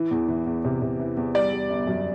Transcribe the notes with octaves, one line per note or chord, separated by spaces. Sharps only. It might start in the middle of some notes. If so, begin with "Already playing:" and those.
Already playing: E3
E2
E3
E2
C3
C3
E3
E2
G3 D5
G3
G1
F#2